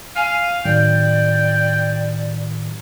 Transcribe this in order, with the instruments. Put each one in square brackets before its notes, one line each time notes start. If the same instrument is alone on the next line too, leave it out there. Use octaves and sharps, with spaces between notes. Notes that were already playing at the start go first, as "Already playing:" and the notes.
[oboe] F5 [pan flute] G#5
[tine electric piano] A2 D#3 F#3 [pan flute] D5 [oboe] G5